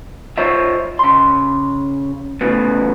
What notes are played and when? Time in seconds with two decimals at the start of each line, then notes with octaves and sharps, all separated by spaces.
0.38 F4 C5 C#5 D#5 E5
0.99 C#3 C6
2.41 A2 C#3 B3